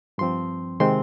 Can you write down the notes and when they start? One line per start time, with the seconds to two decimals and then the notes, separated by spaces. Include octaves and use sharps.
0.18 G2 F3 C4 C6
0.80 C3 D#3 G#3 C4 C6